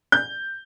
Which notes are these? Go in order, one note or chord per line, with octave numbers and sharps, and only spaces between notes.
G6